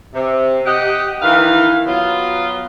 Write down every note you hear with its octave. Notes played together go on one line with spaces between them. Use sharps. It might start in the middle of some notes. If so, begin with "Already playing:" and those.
C3
G4 D#5 F#5
D#3 E3 A#3 A#4 B4 F5
F#3 B3 F4